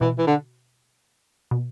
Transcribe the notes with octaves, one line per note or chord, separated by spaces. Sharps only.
B2 E3
E3
D3
B2